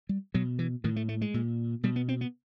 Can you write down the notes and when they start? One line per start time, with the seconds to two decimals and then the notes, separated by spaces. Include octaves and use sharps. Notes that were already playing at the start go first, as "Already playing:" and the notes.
0.09 G3
0.34 B2 F#3
0.59 E3
0.84 A2 D#3
0.96 A3
1.09 A3
1.21 G#3
1.34 A#2
1.83 B2 G3
1.96 B3
2.09 C4
2.21 B3